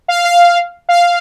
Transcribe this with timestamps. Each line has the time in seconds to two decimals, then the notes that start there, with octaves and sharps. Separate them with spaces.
0.08 F5
0.25 F5
0.89 F5